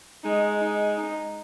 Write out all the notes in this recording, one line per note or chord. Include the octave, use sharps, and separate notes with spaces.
G#3 D#4
D#4
D#4